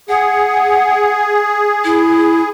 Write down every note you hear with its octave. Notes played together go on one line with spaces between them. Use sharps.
G#4 F#5
E4